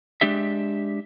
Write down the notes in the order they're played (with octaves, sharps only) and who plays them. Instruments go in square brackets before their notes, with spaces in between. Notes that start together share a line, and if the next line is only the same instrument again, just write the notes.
[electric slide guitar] G#3 D4 G4 E5